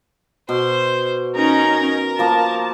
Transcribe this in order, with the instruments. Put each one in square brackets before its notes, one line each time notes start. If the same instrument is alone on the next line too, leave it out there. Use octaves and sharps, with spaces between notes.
[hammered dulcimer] B2 [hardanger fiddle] C5
[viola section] C#4 D#4 A#5 [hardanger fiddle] A#4
[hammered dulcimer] F3 A#3 [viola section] A5